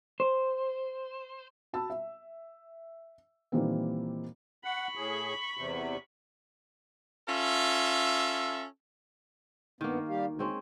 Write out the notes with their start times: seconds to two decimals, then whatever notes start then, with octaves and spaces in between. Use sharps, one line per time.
0.20 C5
1.73 F#4 A5 B5 E6
1.90 E5
3.52 A#2 D#3 E3 G3 A#3 C4
4.64 F#5 B5 C#6
4.96 A2 G#4
5.58 E2 C3
7.29 C#4 F4 A4 E5
9.81 G2 D#3 A#3 B3
10.09 G3 G4 F5
10.26 D2
10.39 G#3 C4 C#4